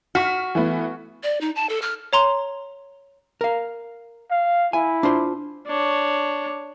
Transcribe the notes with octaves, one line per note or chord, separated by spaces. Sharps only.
F#4 F6 B6
E3 A3 B3
D5
D#4
A5
A4
F6
C#5 A#5 C6
A#4 F5
F5
E4 G#5
D4 F4 C5
D4 C#5